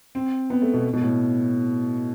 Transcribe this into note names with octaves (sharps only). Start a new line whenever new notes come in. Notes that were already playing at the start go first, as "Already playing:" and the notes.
C4
B3
A3
B2
B2
A2